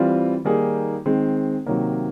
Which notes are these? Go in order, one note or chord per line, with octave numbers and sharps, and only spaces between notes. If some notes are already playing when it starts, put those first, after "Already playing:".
Already playing: E3 G3 C4 F4
D#3 G3 A#3 D#4 G#4
D#3 G#3 C4
C3 D#3 F#3 A#3